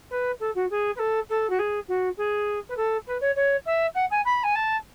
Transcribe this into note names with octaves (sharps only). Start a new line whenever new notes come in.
B4
A4
F#4
G#4
B4
A4
A4
F#4
G#4
F#4
G#4
B4
A4
B4
C#5
C#5
E5
F#5
G#5
B5
G#5
A5